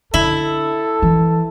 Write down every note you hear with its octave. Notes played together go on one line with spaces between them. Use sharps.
D3 E4 A4
E3